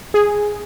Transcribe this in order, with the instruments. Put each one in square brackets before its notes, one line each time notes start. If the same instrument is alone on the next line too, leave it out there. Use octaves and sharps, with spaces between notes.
[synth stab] G#4